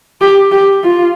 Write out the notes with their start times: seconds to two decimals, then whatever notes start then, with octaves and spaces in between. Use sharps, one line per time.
0.21 G4
0.52 G4
0.83 F4